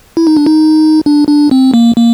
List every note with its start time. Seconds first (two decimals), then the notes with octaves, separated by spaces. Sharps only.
0.17 E4
0.27 D#4
0.36 D4
0.46 D#4
1.06 D4
1.28 D4
1.51 C4
1.74 A#3
1.96 A#3